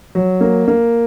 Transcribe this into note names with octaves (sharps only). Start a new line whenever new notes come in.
F#3
A#3
A#3